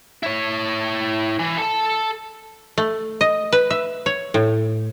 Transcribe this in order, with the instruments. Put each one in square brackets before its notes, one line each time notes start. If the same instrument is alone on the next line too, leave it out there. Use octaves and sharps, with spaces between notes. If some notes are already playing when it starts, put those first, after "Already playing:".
[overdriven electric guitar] E4 C#5
E3
A4 A5
[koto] A3
D#5
B4
E5
C#5
A2